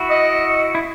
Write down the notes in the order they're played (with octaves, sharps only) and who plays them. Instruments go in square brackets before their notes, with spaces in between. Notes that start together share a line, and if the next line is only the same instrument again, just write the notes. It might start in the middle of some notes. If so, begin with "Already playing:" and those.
Already playing: [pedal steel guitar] E4 F#4
[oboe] D#5
[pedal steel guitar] E4